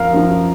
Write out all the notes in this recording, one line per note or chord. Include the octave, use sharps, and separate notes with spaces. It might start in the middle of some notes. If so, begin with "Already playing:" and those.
Already playing: F#2 F3 A#4 F5
F#2 F3